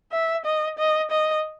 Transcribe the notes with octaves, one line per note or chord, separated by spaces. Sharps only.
E5
D#5
D#5
D#5